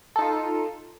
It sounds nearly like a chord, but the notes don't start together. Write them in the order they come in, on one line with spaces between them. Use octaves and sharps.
A4 D#4 F4